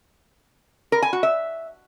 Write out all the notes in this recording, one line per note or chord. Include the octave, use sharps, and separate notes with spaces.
A#4
G#5
F#4
E5